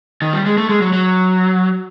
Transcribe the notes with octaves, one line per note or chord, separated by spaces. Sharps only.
D#3
G3
G#3
A3
G#3
F#3
F#3